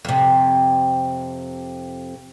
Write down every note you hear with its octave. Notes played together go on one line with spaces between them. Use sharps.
F2 C3